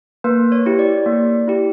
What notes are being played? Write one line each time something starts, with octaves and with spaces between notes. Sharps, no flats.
A#3 B4
C#5
E4 G4
D5
A#3
E4 G4